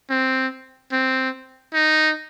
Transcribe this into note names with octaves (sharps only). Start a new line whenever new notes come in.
C4
C4
D#4